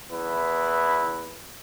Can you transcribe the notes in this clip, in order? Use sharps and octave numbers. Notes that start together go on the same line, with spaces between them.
E2 E4 B4